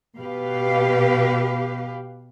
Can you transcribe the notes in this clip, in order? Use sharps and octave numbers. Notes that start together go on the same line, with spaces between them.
B2 G4 B4 F5